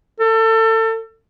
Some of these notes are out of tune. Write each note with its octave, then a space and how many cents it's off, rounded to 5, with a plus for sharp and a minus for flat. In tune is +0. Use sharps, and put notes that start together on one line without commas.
A4 +30